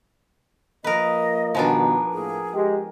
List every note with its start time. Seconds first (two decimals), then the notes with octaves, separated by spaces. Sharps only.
0.84 F3 A#3 A#4 B4 D#5
1.55 G2 B2 D#3 F3 B3 D4 A#4 G#5
2.13 A2 A#3 G#4
2.53 G#3 G4